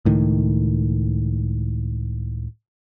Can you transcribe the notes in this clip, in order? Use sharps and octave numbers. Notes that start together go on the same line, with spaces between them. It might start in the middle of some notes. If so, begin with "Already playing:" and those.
C#2 A2 D#3